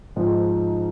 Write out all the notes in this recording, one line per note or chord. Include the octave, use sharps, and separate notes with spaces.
G#2 F3 G#3 D#4